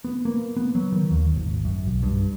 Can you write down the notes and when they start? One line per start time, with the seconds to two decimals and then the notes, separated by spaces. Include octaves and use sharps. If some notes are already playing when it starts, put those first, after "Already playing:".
0.04 B3
0.25 A#3
0.57 B3
0.75 F#3
0.92 D#3
1.11 D#2
1.36 G#1
1.65 F#2
1.87 B1
2.03 G2